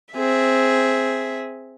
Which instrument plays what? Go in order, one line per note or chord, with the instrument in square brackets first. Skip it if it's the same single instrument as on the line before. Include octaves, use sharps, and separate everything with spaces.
[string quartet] C4 G#4 E5